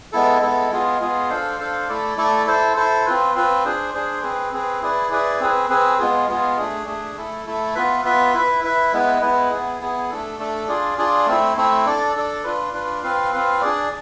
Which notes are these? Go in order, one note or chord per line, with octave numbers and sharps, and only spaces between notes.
G#3 B3 E4 A4
G#3 B3 E4 A4
G#3 B3 F4 G#4
G#3 B3 F4 G#4
D4 A4 C5 F5
D4 A4 C5 F5
A3 E4 A4 D5
A3 E4 A4 D5
E4 A4 C5
E4 A4 C5
C4 F4 B4
C4 F4 B4
D4 G#4 C5
D4 G#4 C5
C4 G#4 B4
C4 G#4 B4
E4 G#4 B4 D5
E4 G#4 B4 D5
C4 G#4 B4
C4 G#4 B4
G#3 B3 F4 G#4
G#3 B3 F4 G#4
A3 D4 G#4
A3 D4 G#4
A3 E4 A4
A3 E4 A4
B3 F4 B4 E5
B3 F4 B4 E5
E4 B4 E5
E4 B4 E5
G#3 B3 E4 B4
G#3 B3 E4 B4
B3 E4 G#4
B3 E4 G#4
A3 D4 A4
A3 D4 A4
D4 F4 G#4 D5
D4 F4 G#4 D5
A3 C4 E4
A3 C4 E4
D4 A4 D5
D4 A4 D5
D4 F4 B4
D4 F4 B4
C4 F4 B4 F5
C4 F4 B4 F5
D4 G#4 D5